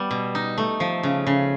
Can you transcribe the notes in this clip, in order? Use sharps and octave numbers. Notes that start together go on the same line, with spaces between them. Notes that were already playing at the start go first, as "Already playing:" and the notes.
Already playing: G3 B3
B2
D#4
A3
F3
C#3
C#3